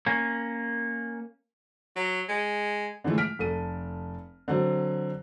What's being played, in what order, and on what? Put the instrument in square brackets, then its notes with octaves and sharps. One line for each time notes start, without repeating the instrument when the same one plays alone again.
[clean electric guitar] A#3 C#4
[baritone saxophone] F#3
G#3
[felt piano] D3 E3 F3 G#3 A3
F6 B6 D7
F1 A4 D#7
D3 F#3 C4